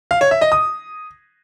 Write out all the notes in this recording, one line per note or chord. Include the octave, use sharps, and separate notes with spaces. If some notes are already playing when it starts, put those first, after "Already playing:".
F5
C#5
E5
D#5
D#6